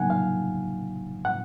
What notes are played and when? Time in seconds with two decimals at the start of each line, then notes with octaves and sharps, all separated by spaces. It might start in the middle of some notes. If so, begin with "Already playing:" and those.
Already playing: C#3 F#3 A#3 D#4 F#5 G#5
0.10 F5
1.25 F#5